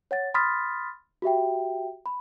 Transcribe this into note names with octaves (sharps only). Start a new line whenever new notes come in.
C#5 F#5 A6
B5 C6 D#6 F6 A6 B6
F#4 G4 E5 G5
B5